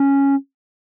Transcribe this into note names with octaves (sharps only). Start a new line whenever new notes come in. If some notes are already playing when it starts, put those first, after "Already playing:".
Already playing: C#4